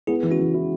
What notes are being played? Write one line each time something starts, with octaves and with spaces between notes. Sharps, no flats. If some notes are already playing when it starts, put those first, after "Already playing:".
B3 E4 G#4
E3
C#4 F#4
E3
E4